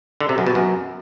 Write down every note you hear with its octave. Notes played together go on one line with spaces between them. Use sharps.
D3
C3
F#2
B2
F#2